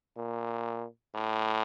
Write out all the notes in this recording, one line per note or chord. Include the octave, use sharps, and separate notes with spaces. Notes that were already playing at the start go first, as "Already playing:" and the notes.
A#2
A2